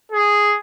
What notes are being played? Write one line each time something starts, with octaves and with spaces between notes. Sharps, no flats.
G#4